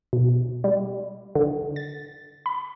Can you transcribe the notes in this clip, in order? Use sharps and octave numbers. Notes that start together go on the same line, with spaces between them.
B2
G3
D3
A6
B5